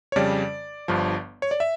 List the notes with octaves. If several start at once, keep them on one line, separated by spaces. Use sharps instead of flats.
C#5
F2 C#3 G3 D5
G1 G2 F3
C#5
D5
E5